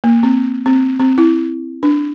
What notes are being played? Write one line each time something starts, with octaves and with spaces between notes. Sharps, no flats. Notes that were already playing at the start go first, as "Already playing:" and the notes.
A#3
C4
C4
C4
E4
D4